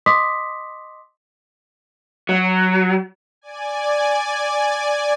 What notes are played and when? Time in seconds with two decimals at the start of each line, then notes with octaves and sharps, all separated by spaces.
0.06 D#5 C6 D6 D#6 B6
2.29 F#3
3.42 D5 G#5